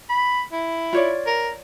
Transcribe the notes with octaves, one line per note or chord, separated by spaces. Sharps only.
B5
E4
F4 C#5 D5
A#4